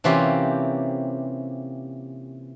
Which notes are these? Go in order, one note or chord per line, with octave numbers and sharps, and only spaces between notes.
C3 E3 A#3 C#4 F4 G4